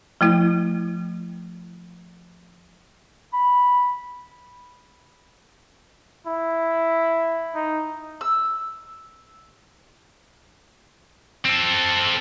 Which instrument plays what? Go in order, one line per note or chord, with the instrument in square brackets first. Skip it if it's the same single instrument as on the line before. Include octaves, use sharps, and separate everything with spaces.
[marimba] F3 A3 E4
[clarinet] B5
[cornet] E4
D#4
[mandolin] E6
[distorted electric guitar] C4 A4